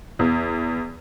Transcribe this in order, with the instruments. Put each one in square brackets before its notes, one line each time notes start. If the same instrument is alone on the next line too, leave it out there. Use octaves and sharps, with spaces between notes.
[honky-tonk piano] E2